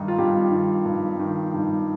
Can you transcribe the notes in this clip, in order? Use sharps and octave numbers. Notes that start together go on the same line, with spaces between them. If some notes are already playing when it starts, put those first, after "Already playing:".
Already playing: G2 D#3 D#4
F4
G2 G4
D#3
G2
D#3
G2